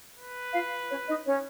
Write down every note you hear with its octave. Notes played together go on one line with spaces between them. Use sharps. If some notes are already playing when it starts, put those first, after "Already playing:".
B4
F4 F5
C#4 C#5
D#4 D#5
C#4 C#5